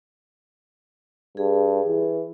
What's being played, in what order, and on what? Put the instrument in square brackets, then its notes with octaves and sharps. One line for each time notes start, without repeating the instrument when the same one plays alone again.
[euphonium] G2 [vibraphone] G#4
[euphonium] E3